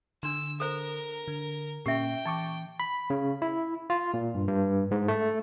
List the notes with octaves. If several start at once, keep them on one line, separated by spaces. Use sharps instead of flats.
D3 D4 C6 E6
A4 A#4 C5
D3
A#2 C#4 G4 E5 G5
E3 A5 C#6 D6
B5
C#3
E4
F4
A#2
G2
G2
G#2
A3